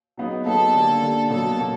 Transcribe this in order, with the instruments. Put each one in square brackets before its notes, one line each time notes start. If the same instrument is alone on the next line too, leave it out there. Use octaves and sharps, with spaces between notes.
[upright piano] F#3 B3 D#4 G#4
[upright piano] F#3 B3 D#4 G#4 [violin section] A4
[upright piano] D3 G3 A#3
D3 G3 A#3
[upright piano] B2 F#3 A#3 [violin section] A4
[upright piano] B2 F#3 A#3